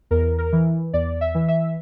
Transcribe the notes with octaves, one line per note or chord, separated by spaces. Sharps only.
E2 A#4
A#4
E3
E2 D5
E5
E3
E5